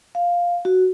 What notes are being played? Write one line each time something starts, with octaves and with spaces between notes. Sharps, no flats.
F5
F#4